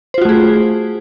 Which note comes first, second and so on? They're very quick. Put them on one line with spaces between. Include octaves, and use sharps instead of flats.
C5 F4 F#4 A3 G#4